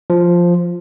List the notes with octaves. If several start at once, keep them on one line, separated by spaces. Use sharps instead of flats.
F3